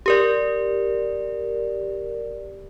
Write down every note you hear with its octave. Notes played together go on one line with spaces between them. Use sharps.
G4 A#4 D5